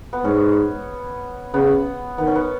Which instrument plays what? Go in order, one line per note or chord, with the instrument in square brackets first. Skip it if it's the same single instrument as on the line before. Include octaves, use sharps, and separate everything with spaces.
[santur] B3
[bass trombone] G#2 [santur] C#4
[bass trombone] C#3 [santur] B3
[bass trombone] D#3 [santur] B3
[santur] C#4
B3